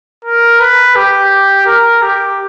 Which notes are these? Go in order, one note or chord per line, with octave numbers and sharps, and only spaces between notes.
A#4
B4
G4
A#4
G4